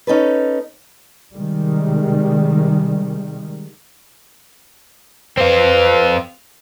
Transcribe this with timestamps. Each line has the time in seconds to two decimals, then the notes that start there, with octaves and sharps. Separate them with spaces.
0.07 C#4 D#4 A4 B4
1.33 C3 D#3 G3 G#3
5.38 C4 F4 B4